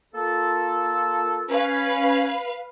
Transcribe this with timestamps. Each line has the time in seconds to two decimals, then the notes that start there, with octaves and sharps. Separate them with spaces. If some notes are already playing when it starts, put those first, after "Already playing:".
0.14 A#3 F4 A4
1.49 C#4 B4 F5